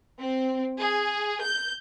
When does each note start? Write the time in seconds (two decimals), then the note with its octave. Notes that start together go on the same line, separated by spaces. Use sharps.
0.19 C4
0.79 G#4
1.42 G6